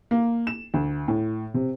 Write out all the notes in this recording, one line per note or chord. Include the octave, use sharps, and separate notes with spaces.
A#3
E7
D2
A2
C3